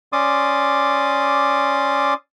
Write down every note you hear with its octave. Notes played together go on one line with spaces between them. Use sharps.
C#4 D5 C6 D6 D#6